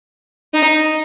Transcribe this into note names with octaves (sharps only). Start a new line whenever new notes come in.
D#4